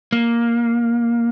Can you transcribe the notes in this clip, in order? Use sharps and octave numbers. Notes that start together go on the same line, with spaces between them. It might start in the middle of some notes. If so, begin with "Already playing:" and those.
A#3